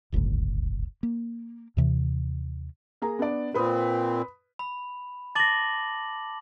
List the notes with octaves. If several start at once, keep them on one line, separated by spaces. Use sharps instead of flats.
D1 G1 C#2 A2
A#3
D#2 C3 E3
A#3 G#4 A#5
B3 D4 D5
A#2 C4 B4 B5 D#6
B5
A5 D6 A6 A#6 F#7